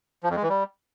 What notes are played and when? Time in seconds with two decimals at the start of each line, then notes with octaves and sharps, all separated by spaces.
0.23 F3
0.30 F2
0.36 G#3
0.43 E3
0.49 G3